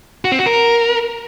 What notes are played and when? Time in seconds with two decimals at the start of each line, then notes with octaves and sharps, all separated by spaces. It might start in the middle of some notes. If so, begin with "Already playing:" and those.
0.25 F#4
0.32 C4
0.39 F#4
0.46 A#4